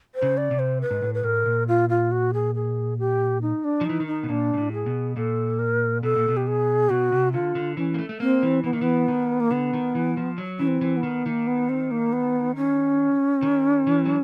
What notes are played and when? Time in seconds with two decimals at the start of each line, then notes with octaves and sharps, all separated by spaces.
0.15 C5
0.22 C#3
0.37 D5
0.51 C3
0.59 C5
0.81 B4
0.91 G#2
1.02 A2
1.14 B4
1.24 A2 A#4
1.46 A#2
1.68 F4
1.89 F4
2.11 F#4
2.34 G#4
2.55 G#4
2.99 G4
3.42 D#4
3.64 D4
3.81 F3
3.85 E3 D#4
4.00 D#3
4.07 D#4
4.23 B2
4.29 A#2 D4
4.54 A#2
4.57 A2
4.73 G#4
4.86 B2
5.16 A#2 A4
5.59 A#4
6.03 B2 A4
6.16 A#2
6.28 B2
6.37 G4
6.47 G#4
6.90 B2 F#4
7.12 C3
7.33 D3 F4
7.55 D3
7.77 E3 C#4
7.94 A#3
7.99 A3
8.09 A3
8.20 A#3 C4
8.43 E3
8.64 E3 B3
8.73 D#3 A#3
8.81 E3 B3
9.08 D#3
9.40 A#3
9.51 D3 B3
9.73 D#3
9.95 E3
10.17 F3
10.38 F#3
10.59 E3 C#4
10.67 C4
10.81 E3
10.97 B3
11.03 D#3
11.26 D#3 A#3
11.47 B3
11.69 C4
11.91 A#3
12.13 B3
12.56 C#4
13.43 D#3
13.87 E3
14.05 F#3